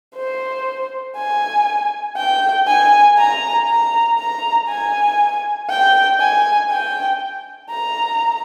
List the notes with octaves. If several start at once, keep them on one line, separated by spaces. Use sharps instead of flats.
C5
G#5
G5
G#5
A#5
A#5
A#5
G#5
G5
G#5
G5
A#5